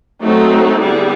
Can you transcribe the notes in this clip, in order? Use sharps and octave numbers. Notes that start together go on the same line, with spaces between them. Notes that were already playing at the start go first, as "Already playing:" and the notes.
F#3 A3 C4 D#4
D3 G3 B3 E4 G#4